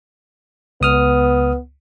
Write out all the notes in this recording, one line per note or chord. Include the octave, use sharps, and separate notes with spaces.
C#2 B3 D#6 F6